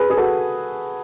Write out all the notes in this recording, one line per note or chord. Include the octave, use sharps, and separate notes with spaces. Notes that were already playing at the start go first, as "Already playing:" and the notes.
Already playing: G#4 B4
G#4
F#4 A4